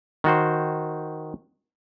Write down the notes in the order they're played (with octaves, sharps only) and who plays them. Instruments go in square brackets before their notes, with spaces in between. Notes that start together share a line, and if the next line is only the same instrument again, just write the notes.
[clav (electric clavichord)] D#3 F#4 C5